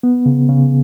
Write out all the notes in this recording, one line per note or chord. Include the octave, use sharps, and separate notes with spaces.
B3
C#3
C#3